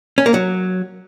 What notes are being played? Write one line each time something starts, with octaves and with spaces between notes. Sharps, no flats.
C#4
A#3
F#3